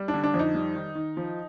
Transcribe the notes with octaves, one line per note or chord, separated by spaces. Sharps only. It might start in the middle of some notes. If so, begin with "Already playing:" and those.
Already playing: G3
D4
D3
D4
F2
D#4
G3
D#3
D#3
F3